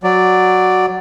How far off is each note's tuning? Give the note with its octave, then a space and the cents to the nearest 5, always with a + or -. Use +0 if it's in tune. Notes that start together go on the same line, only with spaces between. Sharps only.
F#3 +0 D5 +0